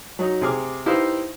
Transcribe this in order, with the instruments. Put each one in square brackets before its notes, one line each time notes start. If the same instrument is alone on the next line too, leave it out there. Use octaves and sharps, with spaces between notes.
[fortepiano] F#3 D#4
C3 G#4 D6 F6
D#4 E4 G4 B4 C5 F5